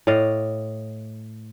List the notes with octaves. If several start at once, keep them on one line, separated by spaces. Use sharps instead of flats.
A2 D5 D#5 F5